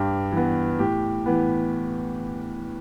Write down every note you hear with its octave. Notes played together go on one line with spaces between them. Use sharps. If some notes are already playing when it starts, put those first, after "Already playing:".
Already playing: G2 G4
E3 B3
A2 G4
E3 B3